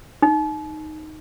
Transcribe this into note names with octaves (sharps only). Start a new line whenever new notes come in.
D#4